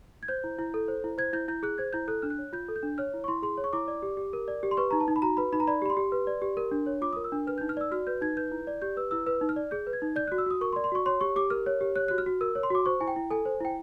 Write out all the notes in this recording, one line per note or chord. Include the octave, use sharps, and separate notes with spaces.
G#6
C5 G6
E4
E4
A4
C5
E4
C5 G#6
E4 G6
E4 G6
G#4 F#6
C5 G#6
E4 G6
A4 F#6
D4 F6
F#6
C#5
F4 G6
A4
G6
D4
C#5 F6
E4
C#6
E4 C6
G#4 C6
C#5
C#6
E4 D6
D5
G4
G4
A#4
D5
G4
C6
B4 C#6
D#4 A#5
A5
D#4
B5
F#4 A#5
B4 B5
D#4 B5
A#5
D5 B5
G4 B5
C6
G4
B4
D5
G4
A#4
D4
C#5
F4 D6
A#4 D#6
E6
D4
B4 F6
D#4 G6
F6
D5 E6
F#4 F6
B4 G6
D#4 G#6
B4 G6
E4
D5
G4 G6
B4 E6
E4 E6
B4 E6
D#4
F6
D5
G#4 G6
B4
G#6
D#4
D5 G6
F#4 F#6
E6
F#4 D#6
A#4 C#6
C6
D5
C6
F#4 C#6
C#5 C6
G4 C#6
G4 D6
A#4 F6
C#5
G4
C#5 F#6
F#4 F#6
F6
F#4
A#4 E6
C#5
C6
F#4 D6
C5 C#6
E4 G#5
G5
E4
A4 G#5
C5
E4 G5